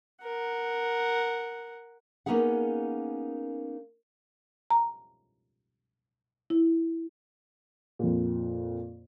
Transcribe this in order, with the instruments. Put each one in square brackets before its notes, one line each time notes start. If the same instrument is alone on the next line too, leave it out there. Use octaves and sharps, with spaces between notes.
[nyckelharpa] A#4 F#5
[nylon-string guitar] A#3 B3 C#4 D#4 G#4 F#5
[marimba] A#5
E4
[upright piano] F2 A#2